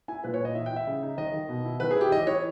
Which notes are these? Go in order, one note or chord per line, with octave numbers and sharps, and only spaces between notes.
E4 G#5
A#2 B4
C#5
A#2
D#5
E3 E5
G5
E4
E5
C#3
D#4
D#3 D#5
D#3
B2
E4
D#3 B4
G#4
E4 G4
E3 D#5
E3 C#5